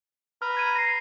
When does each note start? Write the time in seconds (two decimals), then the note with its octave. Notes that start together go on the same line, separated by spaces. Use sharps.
0.42 B4 A#5 B5 F6
0.57 G#6 D#7
0.75 A#6 C7